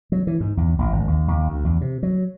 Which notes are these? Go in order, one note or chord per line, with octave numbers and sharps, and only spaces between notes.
F#3
E3
G#2
E2
A1
G#1
D#2
D#2
D2
E2
C3
F#3